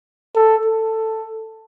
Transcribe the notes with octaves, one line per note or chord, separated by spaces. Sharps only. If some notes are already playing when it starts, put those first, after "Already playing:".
A4
A4